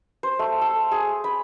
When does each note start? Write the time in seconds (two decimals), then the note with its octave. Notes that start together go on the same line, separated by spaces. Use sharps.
0.23 C5
0.39 A3
0.61 A4
0.92 G#4
1.24 B5